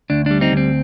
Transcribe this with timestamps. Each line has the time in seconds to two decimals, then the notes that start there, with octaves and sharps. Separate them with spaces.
0.10 D2 D4
0.26 G3 D4
0.41 C4 D#4
0.52 D2 C4